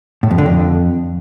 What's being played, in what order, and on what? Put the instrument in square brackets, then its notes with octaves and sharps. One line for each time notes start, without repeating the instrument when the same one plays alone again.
[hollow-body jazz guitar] A2
F2
D3
F2